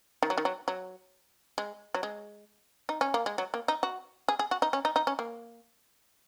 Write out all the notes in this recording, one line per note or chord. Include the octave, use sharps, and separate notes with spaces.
D#3
F#3
D#3
F#3
F#3
G#3
F#3
G#3
D#4
C#4
A#3
G#3
F#3
A#3
D#4
F#4
G#4
G#4
F#4
D#4
C#4
D#4
D#4
C#4
A#3